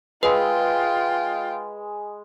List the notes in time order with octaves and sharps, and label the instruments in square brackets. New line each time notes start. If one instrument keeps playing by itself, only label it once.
[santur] G#3 B5 [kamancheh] F4 G5 [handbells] B4